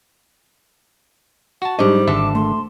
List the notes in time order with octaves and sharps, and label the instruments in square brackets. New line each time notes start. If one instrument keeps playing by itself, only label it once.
[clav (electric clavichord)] F#4 A5 [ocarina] F#5
[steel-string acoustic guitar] G#2 G3 [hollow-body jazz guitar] F#3 D4 D#5 [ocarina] D6
[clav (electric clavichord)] G#1 D3 A4 [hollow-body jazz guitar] E5 [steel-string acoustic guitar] A5
[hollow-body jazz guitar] A3 [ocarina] C6